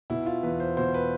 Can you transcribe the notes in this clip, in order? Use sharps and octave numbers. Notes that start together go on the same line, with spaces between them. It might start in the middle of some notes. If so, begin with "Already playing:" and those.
B2 E4
F4
E2 B4
C5
B2 C5
B4